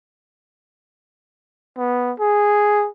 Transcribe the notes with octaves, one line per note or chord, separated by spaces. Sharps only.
B3
G#4